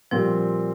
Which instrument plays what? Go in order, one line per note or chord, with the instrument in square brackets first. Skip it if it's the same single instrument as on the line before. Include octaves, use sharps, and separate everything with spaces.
[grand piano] A#2 G3 C4 [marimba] F3